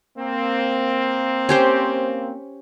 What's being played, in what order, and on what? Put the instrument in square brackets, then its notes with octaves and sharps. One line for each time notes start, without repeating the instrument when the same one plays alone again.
[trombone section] A#3 C4
[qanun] C#4 G4 C5